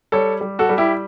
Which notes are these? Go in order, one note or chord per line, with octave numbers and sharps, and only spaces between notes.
G3 A4 C#5
G3
F#4 A4
G3
E4 G4